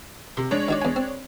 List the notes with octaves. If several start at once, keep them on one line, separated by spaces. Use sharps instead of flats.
C3 C6
G#3 D4 C#5
D#3 F#4 D5
E2 G#5
C4